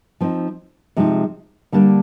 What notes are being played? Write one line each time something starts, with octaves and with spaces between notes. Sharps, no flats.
F3 C4 D#4
C3 F3 G#3 D#4
D3 G3 A#3 D4